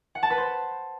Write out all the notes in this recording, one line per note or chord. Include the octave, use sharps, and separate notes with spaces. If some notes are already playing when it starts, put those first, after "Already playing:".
F#5
A5
B4
C5